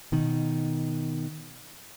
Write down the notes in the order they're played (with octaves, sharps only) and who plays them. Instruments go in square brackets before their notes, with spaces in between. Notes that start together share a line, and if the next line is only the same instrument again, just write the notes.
[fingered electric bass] B2 D#3